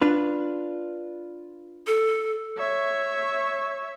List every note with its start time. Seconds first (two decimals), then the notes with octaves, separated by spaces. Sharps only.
0.02 D4 F4 B4
1.87 A4
2.58 C#5 E5